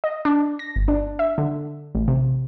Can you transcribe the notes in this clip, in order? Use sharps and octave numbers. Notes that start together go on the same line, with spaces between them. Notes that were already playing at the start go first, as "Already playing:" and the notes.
D#5
D4
A#6
G1
D4
E5
D3
A1
C3